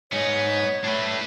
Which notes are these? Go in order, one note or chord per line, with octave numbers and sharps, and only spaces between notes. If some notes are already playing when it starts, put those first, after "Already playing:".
G#2 B3 D#4 C#5
A2 A3 D4 B4